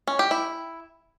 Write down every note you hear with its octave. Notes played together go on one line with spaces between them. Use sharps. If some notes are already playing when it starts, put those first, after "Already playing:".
C#4
G4
E4